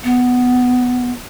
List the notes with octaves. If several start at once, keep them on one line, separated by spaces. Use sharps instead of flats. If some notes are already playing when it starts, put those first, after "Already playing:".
B3